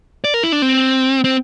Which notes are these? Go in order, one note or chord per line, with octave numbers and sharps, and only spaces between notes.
D5
A#4
E4
D4
C4
C4